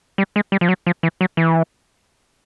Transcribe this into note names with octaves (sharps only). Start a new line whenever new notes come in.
G3
G#3
G3
F3
F#3
F3
E3
F#3
E3